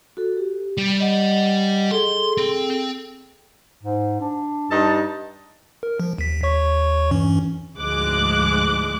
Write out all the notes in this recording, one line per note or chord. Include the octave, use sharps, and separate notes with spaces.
F#4 A4
G4
G3
D#5 F#5
G#4 A4 C6
C4
G#2
D4
G2 D#4 A5
A#4
F3
D#2 B6
D#2 C#5 C#6
G2 E3 C#4
D2 G#2 F3 G#3 D6 F#6